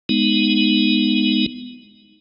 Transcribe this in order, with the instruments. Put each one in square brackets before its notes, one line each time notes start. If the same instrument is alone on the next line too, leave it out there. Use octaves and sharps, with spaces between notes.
[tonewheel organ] G#3 B3 D#4